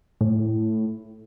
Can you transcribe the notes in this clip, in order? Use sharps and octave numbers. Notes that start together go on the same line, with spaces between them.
A2